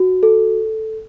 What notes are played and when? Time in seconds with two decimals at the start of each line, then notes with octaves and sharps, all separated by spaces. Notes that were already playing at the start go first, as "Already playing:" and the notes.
Already playing: F#4
0.23 A4